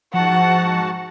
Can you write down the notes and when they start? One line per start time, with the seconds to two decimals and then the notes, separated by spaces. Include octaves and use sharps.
0.14 G#2 F3 F#4 F#5 A5